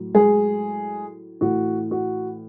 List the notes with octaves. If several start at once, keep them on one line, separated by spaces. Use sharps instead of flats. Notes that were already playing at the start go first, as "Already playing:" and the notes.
Already playing: A2 F#3
G#3 G#4
A2 E3 F#4
F#4